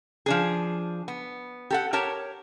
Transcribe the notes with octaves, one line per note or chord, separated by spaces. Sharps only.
F3 D4 G#4
B3
G4 A4 F#5
G4 A#4 C#5 A5